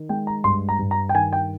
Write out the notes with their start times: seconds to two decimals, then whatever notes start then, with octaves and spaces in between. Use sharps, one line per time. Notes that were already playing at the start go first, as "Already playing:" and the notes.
Already playing: D#3
0.09 G#3 G5
0.27 A#5
0.44 G2 C6
0.69 A#5
0.79 G2
0.91 A#5
1.09 G5
1.14 D#3 G#5
1.33 G5